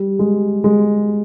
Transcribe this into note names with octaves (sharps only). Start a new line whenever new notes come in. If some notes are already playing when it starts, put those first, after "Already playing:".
Already playing: G3
G#3
G#3